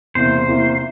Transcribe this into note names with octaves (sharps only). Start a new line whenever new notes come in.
E2 C3 E3 A#3 C5
E2 C3 E3 A#3